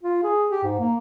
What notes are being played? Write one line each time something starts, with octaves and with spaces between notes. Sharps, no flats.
F4
G#4
G4
G#2
A#3